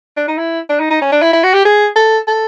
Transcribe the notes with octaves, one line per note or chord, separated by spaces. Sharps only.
D4
D#4
E4
D4
D#4
D#4
C#4
D4
E4
E4
F#4
G4
G#4
A4
A4